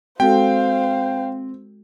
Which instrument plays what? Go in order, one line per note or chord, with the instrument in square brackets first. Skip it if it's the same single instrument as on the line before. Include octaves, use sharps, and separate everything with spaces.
[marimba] G#3 F#4 A4 [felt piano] C4 [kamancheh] C5 F5 [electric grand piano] G5